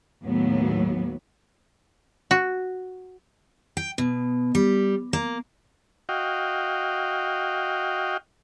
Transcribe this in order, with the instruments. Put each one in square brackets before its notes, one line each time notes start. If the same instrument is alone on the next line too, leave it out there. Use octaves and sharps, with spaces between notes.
[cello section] D#2 A2 F#3 B3
[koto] F#4
[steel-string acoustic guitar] G5
B2
G3
A#3
[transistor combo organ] F#4 D#5 F5 G5